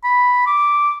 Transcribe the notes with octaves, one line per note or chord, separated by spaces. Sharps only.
B5
D6